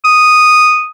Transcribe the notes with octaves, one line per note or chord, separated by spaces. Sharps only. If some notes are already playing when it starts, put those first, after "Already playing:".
D#6